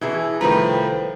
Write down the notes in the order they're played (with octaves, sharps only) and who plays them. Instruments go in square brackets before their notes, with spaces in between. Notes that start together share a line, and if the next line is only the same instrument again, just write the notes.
[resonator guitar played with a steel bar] B2 E4 G#4 [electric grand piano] E3
[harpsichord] C2 A2 [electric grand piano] D#3 F3 A#5 [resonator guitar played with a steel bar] B4 [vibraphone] C5 G5